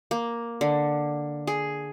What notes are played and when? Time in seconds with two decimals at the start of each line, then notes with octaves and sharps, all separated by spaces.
0.11 A#3
0.61 D3
1.47 G#4